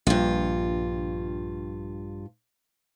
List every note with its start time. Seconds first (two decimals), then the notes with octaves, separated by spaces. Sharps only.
0.07 A#1 G2 F4